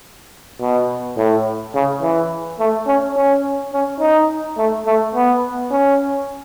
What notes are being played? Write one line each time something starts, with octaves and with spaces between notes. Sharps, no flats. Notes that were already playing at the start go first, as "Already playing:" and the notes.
B2
A2
C#3
E3
A3
C#4
C#4
C#4
D#4
A3
A3
B3
C#4